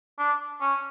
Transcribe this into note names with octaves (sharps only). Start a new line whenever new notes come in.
D4
C#4